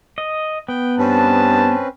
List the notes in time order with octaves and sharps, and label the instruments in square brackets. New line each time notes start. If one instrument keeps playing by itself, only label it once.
[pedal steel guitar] D#5
[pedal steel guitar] B3 [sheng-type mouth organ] G5
[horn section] G2 A5 [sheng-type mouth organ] C4 C#4 B4